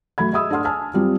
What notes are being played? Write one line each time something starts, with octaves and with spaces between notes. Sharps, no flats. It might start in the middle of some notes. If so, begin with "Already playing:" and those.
F#3 A3 B5 G#6
G#4 D#5 E5 B5 D#6 E6
D4 A4 F#5 C6 F6
G#5 A5 E6 F6
F#3 G3 C4 F4